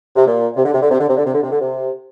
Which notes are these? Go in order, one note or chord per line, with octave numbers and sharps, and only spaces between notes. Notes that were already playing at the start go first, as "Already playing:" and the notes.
C3
A#2
C3
D3
C3
D3
C3
D3
C3
D3
C3
D3
C3
D3
C3